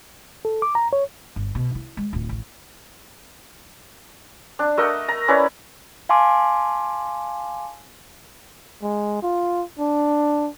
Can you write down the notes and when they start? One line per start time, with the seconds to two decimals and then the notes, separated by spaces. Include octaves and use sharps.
0.45 A4
0.62 D6
0.75 A#5
0.93 C#5
1.36 G1
1.55 B2
1.75 E4
1.97 G#3
2.13 D1 F4
2.29 A1
4.59 D4
4.77 A3 A#4 D#5 F#5
5.08 A#5
5.28 C#4 E4 B4 D5
6.09 F5 G#5 A5 C6 D6
8.83 G#3
9.23 F4
9.79 D4